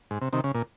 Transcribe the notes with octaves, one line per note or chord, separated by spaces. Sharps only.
G#2
C3
C3 D#3
C#3
A#2